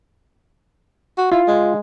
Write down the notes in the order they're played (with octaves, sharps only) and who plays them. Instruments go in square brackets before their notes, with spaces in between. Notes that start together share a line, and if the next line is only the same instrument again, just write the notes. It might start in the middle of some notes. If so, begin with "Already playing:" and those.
[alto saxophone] F#4
[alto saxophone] E4 [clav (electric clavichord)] F4
[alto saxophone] G#3